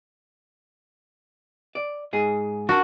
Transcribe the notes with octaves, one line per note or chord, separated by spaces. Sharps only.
D5
G#2 G#4
D4 F#4 A#4 A5